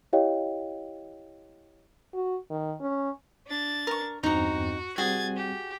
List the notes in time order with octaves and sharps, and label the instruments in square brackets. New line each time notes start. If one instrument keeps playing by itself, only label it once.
[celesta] E4 G4 C#5 D#5 F5 G5
[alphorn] F#4
D#3
C#4
[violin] D4 A6
[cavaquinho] A#4 C#6
[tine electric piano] E2 G2 C4 [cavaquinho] D#4 A#5 [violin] F#4
[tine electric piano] G3 C4 [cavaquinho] F#4 G#4 [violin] G#6 A6
[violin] G4